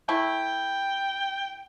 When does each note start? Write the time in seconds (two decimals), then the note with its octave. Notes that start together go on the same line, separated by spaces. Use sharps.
0.09 A3 E4 G5